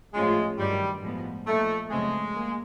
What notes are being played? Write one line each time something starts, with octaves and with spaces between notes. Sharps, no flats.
A2 F3 G#3 A3 C#4 F4
G2 D#3 F#3 G3
A2 F3 G#3 B3
A#2 F3 A3 A#3 D#4
F#2 C#3 F3 G#3 A3 C4
A#3